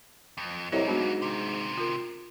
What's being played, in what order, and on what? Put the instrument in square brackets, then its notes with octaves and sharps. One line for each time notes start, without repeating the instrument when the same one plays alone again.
[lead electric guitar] F2
[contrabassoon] C2 [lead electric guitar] F#3 A#3 [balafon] C#5 D#5
[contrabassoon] G#2 [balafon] B3 D4 F#4
[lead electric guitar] C3 D#3 [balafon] D6
[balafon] F4 A#4